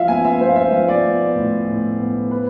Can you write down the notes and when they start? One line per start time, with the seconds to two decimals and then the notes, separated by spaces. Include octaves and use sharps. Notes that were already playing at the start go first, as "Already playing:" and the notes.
Already playing: F3 E5 F5
0.08 B3 G#5
0.25 E5
0.41 B3 C5
0.49 F5
0.56 E5
0.72 F3 F5
0.88 D5
1.04 B3
1.35 A2
1.68 A2
1.99 B3
2.31 B4